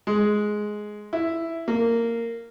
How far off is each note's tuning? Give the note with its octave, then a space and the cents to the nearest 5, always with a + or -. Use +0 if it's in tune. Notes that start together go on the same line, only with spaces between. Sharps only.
G#3 +10
E4 +5
A#3 -15